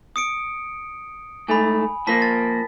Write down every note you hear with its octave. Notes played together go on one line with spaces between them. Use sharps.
D#6 C#7 D7
G#2 A3 G#5 B5
A#2 F3 A#3 A5 B6
A6